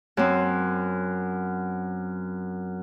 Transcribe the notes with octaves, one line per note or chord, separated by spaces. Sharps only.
F#2 C4